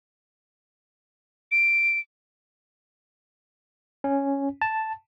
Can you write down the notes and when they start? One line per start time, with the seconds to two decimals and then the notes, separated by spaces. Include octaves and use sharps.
1.51 D7
4.04 C#4
4.62 A5